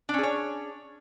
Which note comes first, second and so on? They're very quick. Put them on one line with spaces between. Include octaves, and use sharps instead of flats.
D4 C#4 G#4 C#5